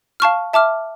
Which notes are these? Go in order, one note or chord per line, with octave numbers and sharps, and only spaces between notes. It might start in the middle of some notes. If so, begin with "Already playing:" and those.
F5 A5 C#6 F6
E5 A5 D6 F6